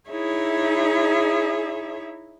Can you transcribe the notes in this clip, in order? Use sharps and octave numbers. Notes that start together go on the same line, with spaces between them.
D#4 E4 G#4 C#5 E5